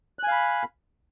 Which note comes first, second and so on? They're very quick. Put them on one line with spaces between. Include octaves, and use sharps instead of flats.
F#6 G#5 F5 B5